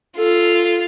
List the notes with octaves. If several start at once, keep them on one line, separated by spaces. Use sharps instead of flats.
F4 A4